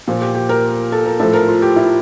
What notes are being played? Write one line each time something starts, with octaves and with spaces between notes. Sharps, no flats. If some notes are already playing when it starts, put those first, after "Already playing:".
A#2 F3
G4
G4
A#4
A4
A#4
A2 F3 A4
A#4
F4
G4
E4